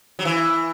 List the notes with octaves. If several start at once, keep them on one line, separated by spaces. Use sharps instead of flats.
F#3
E3